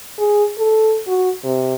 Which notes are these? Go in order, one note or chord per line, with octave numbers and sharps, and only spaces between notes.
G#4
A4
F#4
C3